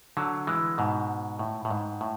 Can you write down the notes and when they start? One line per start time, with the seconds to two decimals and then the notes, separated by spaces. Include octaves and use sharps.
0.17 D3 F#3
0.47 E3 G#3
0.78 G#2 B2
1.39 A2
1.65 A2
1.71 G#2
2.01 A2